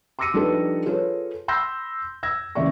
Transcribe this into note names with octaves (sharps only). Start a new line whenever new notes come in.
C6 D6 E6 A#6 C#7 D#7
F3 G3 D4 D#4 A4 B4
F4 G#4 A4 B4 C#5
B5 C6 E6 G6 A#6
E6 G#6 A#6
F#1 C#2 E3 D5 E5 C#6